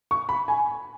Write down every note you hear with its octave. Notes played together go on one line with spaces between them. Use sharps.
C#6
B5
G#5